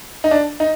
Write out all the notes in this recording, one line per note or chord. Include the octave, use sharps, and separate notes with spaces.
D#4
D4
D#4